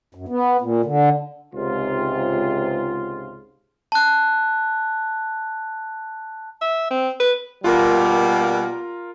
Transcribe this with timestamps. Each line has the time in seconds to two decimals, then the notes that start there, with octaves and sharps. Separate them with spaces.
0.15 F#2
0.28 B3
0.61 A#2
0.85 D3
1.54 C#2 G#2 C3 F4
3.92 A5 F#6
6.61 E5
6.91 C4
7.20 B4
7.64 B2 G3 A#3 F4 A#4